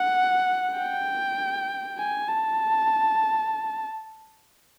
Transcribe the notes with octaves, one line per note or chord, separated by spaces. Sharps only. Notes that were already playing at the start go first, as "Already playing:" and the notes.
Already playing: F#5
G5
G#5
A5